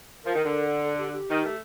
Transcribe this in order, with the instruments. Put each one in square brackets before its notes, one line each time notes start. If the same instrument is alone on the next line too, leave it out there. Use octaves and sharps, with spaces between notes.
[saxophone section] F3 [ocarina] A#4
[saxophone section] D#3
D3
[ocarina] A4
G4
G4
[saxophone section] D#3
A3